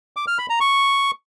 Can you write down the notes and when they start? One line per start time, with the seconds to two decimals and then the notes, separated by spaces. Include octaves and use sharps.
0.17 D6
0.28 F6
0.39 B5
0.50 A#5
0.60 C#6